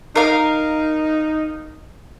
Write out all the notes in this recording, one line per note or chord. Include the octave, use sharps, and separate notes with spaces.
D#4 A#4 F5